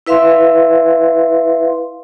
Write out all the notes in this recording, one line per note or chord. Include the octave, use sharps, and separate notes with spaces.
E4 B4 E5 F5 C6